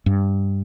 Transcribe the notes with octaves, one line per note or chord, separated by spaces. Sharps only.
G2